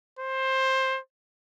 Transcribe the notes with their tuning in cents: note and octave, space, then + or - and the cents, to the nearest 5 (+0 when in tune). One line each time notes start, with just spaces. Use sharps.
C5 +15